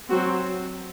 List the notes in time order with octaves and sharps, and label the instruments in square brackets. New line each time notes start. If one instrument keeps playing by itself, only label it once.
[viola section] F#3 C4 F#4